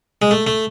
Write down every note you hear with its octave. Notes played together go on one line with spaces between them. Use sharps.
G#3
A3
A3